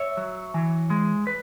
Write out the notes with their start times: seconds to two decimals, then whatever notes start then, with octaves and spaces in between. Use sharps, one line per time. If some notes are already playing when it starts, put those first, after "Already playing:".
Already playing: C#5 E5
0.17 F#3
0.54 E3
0.90 G#3
1.27 B4